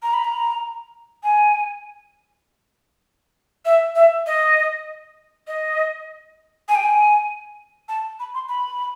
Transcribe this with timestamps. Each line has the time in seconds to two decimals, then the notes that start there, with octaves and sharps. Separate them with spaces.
0.03 A#5
0.13 B5
0.24 A#5
1.23 G#5
3.65 E5
3.95 E5
4.27 D#5
5.47 D#5
6.68 G#5
6.75 G5
6.83 G#5
7.89 A5
8.20 B5
8.34 C6
8.49 B5